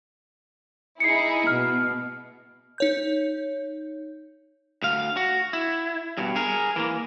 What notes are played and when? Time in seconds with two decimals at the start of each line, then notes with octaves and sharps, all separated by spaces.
1.00 D#4 E4 G#4 C7 C#7
1.47 B2 F6
2.78 D#4 C#5 G6
4.82 D2 F5
5.17 F#4
5.53 E4
6.17 G2 B2
6.36 G#4 A#4
6.76 E3 A#3